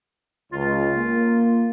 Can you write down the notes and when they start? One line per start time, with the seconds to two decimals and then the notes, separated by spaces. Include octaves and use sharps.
0.52 C#2 F4
0.95 A#3